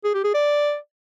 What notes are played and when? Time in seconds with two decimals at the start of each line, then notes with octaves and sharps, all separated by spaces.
0.04 G#4
0.14 G4
0.24 G#4
0.34 D5